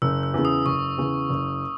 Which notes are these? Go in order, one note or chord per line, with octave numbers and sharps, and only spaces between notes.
F#1 E6
E6
E2 C#3
D#6
F#1 C#6
E2 C#3
F#1